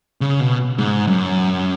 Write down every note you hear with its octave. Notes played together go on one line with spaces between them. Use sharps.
C#3
B2
G#2
F#2